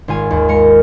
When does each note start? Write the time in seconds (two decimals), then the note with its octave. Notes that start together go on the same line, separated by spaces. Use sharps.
0.08 G#1 F4 G#5
0.31 D#2
0.48 G#3 A#4 C#7